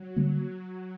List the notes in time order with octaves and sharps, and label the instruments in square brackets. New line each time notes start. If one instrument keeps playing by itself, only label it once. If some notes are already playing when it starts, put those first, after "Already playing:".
Already playing: [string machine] F#3
[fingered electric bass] D3 G3 A#3